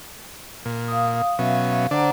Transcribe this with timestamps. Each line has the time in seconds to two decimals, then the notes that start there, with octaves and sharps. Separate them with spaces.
0.65 A#2
0.88 F5 D#6
1.39 B2 F#3 C#4 E5 F5
1.91 D3 D4 C5 F#5 A#5